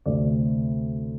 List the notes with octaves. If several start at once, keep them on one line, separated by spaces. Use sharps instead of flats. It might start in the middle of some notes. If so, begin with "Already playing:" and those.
D2 C3 A3 C4 D5